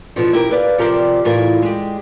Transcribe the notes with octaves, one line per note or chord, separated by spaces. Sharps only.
B2 D3 E3 F3
E4 G4 A#4
B4 D5 F5
C3 F3 G4 A#4 C5 D5
A2 E3 E4 F4 A#4
G#3 G4